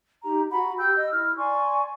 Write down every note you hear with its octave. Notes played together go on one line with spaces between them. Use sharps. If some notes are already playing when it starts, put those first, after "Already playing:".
D#4 G4 A#5
F#4 F#5 A#5 B5
G4 G5 E6 G6
D#5 E6
E4 F6
D5 G#5 C6 C#6